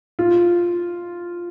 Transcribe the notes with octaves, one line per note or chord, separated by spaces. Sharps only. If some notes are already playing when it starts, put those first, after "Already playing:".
F4